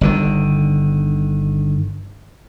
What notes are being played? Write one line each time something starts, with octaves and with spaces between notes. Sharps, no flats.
G1 D3 D#3